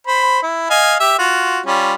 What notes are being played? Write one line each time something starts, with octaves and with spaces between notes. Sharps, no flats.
C5 B5
E4
D#5 F5 G#5
G4 E5
F4 F#4
G3 C#4 F4